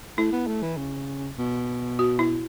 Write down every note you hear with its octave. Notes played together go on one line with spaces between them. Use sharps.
A3 E4
B3
A3
E3
C#3
B2
F#4
E4